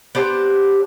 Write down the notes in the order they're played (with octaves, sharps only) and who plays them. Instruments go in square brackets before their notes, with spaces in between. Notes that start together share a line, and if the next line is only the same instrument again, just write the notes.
[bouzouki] B3 D4 G4 C5